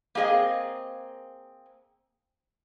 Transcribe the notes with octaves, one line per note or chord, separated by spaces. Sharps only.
A#3 C4 G#4 D#5 F5